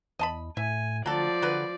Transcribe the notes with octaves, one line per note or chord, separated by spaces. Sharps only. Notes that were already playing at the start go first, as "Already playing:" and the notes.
E2 D#5 A5 B5
A2 E5 G#5
D2 F3 F#3 A4 D5
D3 F#3 B4